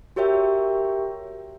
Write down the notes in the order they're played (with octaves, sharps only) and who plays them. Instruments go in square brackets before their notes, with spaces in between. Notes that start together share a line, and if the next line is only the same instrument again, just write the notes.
[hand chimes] F#4 G4 A#4 C#5 E5 G5